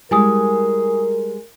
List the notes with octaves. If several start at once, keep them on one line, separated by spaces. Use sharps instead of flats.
G3 G#3 E4 A#4 G#5 D#6